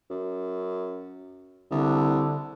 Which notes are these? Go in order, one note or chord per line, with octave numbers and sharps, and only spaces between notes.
F#2
C2 D3